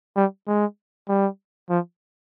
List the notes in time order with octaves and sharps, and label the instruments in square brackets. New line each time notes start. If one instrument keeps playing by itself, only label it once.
[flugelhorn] G3
G#3
G3
F3